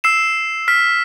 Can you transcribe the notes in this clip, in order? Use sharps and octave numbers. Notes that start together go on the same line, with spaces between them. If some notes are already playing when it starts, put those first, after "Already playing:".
E6 C7 E7
F6 B6